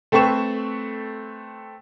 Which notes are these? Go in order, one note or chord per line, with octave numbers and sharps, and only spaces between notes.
A3 C4 A4 B4 C#6 E7